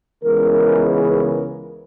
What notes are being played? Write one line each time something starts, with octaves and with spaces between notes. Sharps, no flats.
C#2 C#3 E3 G#3 B3 A#4
A#4